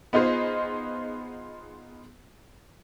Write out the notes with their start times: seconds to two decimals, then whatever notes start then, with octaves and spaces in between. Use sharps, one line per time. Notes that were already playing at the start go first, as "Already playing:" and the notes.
0.13 B3 D#4 F4 G#4 C5